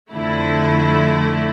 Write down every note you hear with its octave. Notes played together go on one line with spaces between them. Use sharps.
F2 D3 A3 E4